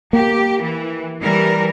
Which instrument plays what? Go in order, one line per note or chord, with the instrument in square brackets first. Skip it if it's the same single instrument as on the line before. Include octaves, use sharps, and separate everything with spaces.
[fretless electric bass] A#3 [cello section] G4
[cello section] E3
E3 G3 A#4